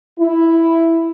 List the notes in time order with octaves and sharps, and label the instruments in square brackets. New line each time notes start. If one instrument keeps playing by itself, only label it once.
[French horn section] E4